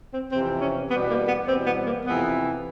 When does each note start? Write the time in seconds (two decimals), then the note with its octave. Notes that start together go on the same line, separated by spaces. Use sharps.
0.14 C4
0.32 F2 C3 E3 C4
0.61 C#4
0.90 E2 B2 G3 B3
1.10 A#3
1.28 B3
1.48 E2 B2 G3 C4
1.67 B3
1.86 A#3
2.05 F2 C3 E3 B3